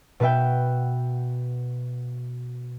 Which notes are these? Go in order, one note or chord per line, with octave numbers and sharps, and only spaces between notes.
B2 F#4 B4 E5 G5